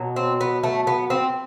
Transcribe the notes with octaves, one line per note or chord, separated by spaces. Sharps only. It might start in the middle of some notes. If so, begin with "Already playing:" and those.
Already playing: B2 F#3
C4
B3
A3
B3
C4